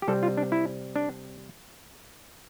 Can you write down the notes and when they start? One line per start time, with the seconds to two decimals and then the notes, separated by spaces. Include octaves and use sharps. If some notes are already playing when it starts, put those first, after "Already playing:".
0.02 G4
0.08 C3 G3 C4 A4
0.23 F4
0.37 D4
0.52 E4
0.96 D4